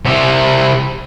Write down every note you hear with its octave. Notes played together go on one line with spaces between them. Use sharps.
C3 E4